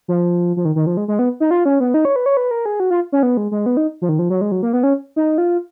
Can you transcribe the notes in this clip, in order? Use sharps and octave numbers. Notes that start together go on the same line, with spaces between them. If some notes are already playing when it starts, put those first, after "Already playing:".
F3
F3
D#3
D#3
F3
G#3
G#3
B3
D#4
F4
C#4
B3
D#4
C#5
B4
C#5
B4
A#4
G#4
F#4
F4
C#4
B3
G#3
G#3
B3
D#4
F3
D#3
F3
F#3
G#3
F#3
A#3
B3
C#4
D#4
F4